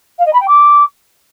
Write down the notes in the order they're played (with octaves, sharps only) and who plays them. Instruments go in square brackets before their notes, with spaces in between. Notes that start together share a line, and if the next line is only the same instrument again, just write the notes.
[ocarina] F5
D#5
B5
G5
D6